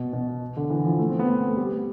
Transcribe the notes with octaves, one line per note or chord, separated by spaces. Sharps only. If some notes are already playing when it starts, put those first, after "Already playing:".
Already playing: B2
B2
D3
E3
F3
A3
C4
B3
A3
A3
G3